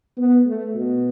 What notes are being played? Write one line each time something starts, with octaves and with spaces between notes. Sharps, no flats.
B3
A3
B2